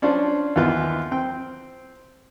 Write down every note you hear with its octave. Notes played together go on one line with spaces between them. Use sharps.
C#4 D4 F4 C5 D5 A5
D#2 E3 B3 F4 B4
C4 G5